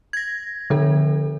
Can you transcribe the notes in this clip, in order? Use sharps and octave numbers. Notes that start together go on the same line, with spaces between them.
G#6 A#6
D3 F3 A4